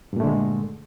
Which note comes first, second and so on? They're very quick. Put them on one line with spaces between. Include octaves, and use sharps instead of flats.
G2 A#2 A3 D3 G#3